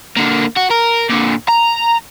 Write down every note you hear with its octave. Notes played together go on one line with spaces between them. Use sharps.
D3 A#3
F#4
A#4
A#2 D3
A#5